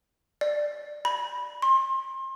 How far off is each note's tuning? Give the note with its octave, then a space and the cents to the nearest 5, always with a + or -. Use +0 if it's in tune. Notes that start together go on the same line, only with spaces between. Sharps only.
D5 +10
B5 -15
C6 +30